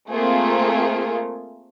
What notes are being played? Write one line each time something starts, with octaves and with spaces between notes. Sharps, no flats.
A3 A#3 C4 F4 G#4 A#4